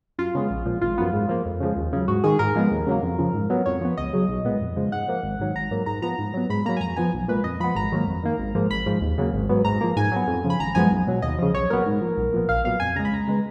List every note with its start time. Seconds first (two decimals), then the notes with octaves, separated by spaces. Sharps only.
0.18 F#2 F4
0.35 C#3 G#3 B3
0.51 A#1
0.66 A#2 F3
0.82 G#1 F4
0.98 F#2 F3 B3
1.13 G#2
1.29 F3 A#3
1.46 F2
1.60 C#3 F3 G#3
1.76 D#2
1.93 C#3 F#3
2.08 G#2 F#4
2.24 D#3 G#3 G#4
2.39 G#2 A#4
2.56 F3 G#3 B3
2.71 D#2
2.86 C#3 F#3 A#3
3.03 F2
3.19 C#3 F3
3.34 G#2
3.50 F#3 B3
3.66 F2 C#5
3.81 F3 B3
3.97 C#2 D#5
4.13 C#3 F#3
4.29 B1
4.45 A#2 G#3 B3
4.60 F2
4.76 C#3 F3 G#3
4.92 G#2 F#5
5.08 F3 A#3
5.23 G#1
5.39 G#2 D#3 F#3
5.55 G#1 A#5
5.71 G#2 F#3 A#3
5.86 G#2 A#5
6.02 F3 B3 A#5
6.19 G#2
6.34 F#3 B3
6.50 G#2 B5
6.66 F#3 A#3 A#5
6.77 G#5
6.81 F2 A#5
6.96 F3 B3 G#5
7.13 B1
7.28 A#2 G#3 B4
7.44 F2 D#5
7.60 F3 B3 B5
7.75 G#1 A#5
7.92 G#2 D#3 F#3 A#3
8.07 F2
8.23 D#3 A#3
8.39 G#1
8.55 G#2 F3 A#3
8.70 G#1 B5
8.86 G#2 F3
9.01 D#2
9.18 C#3 F#3 A#3
9.34 G#1
9.49 G#2 F#3 B3
9.65 G#2 A#5
9.81 F3 A#3
9.96 G#2 G#5
10.12 F#3 B3
10.27 F2
10.44 C#3 F3
10.50 B5
10.60 G#1 A#5
10.75 F#2 F3 G#3 B3 G#5
10.90 B1
11.07 B2 F#3
11.22 D#2 D#5
11.38 C#3 F3
11.54 B1 C#5
11.70 A#2 F#3 B3 A#4
11.86 G#2
12.01 F3 A#3
12.17 B1
12.33 A#2 F3 B3
12.49 A#1 F5
12.64 A#2 F#3 B3 F5
12.80 F2 G#5
12.95 C#3 G#3 A#5
13.05 B5
13.12 C#2 A#5
13.27 C#3 G#3 B3